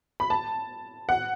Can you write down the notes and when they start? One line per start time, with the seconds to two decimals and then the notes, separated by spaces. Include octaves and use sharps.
0.20 B5
0.30 A5
1.09 F#5